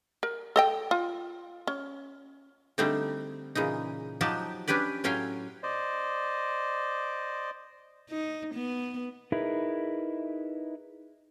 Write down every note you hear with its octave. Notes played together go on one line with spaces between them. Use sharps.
A#4
A4 D#5 G5
F4
C#4
D3 G3 A3 C4 D#4 A4
A#2 C#3 E3 D#4
F3 F#3 D#4 F#4 G4 A5
C#4 D4 G4 B4 D5
A2 F#3 C#4 C#5 F5 G5
C5 D5 D#5
D#4
B3
D#4 E4 G#4 A#4 B4